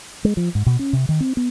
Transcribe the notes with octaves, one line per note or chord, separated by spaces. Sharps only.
G#3
F3
G#2
B2
C#4
C3
D#3
C4
B3